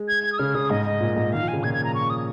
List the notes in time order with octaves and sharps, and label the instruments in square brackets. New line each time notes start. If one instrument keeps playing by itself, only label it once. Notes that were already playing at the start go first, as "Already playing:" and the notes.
Already playing: [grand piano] G#3
[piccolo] G#6
G#6
D#6
[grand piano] C#3 [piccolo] F6
[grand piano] C#3 [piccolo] D#6
[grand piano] G#2 [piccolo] D#5
[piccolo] D#5
[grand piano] A#2
G#2
[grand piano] D#3 [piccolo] F5
[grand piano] F3
[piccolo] G#5
[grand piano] C#3
[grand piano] A#2 [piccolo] G#6
[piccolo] G#6
A#5
C#6
D#6